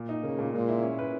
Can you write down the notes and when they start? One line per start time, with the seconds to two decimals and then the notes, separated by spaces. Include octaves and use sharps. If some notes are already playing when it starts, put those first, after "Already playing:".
Already playing: A#2
0.09 D#4
0.23 C#3 A#3
0.39 A#2
0.54 A#2 G#3
0.68 E4
0.83 C#4
0.99 B4